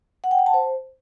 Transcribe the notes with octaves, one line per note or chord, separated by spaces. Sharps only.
F#5
G5
F#5
A5
C5